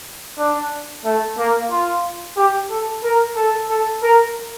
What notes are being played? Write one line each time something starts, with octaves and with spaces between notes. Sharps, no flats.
D4
A3
A#3
F4
G4
A4
A#4
A4
A4
A#4